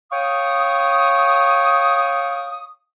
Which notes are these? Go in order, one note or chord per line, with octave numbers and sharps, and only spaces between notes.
C#5 F5 G5 C#6 D#6